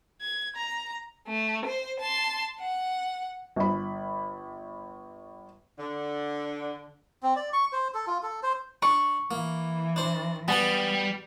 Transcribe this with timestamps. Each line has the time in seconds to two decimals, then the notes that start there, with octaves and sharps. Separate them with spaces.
0.22 G#6
0.56 A#5
1.27 A3
1.65 C5
2.00 A5 C6
2.60 F#5
3.56 G1 B5
5.79 D3
7.23 C4
7.36 D5
7.53 C#6
7.72 C5
7.94 A4
8.07 F4
8.23 A4
8.43 C5
8.82 D4 C#6
9.31 E3 A#3
9.96 D4 C5
10.48 G3 B3 B4 G#5 A5